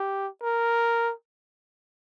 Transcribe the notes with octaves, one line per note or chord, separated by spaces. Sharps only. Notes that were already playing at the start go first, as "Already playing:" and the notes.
Already playing: G4
A#4